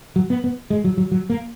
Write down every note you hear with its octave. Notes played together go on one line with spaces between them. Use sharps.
F#3
B3
B3
G#3
F#3
F#3
F#3
A#3